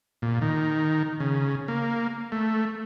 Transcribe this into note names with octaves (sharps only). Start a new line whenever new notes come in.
A#2
D#3
C#3
A#3
A3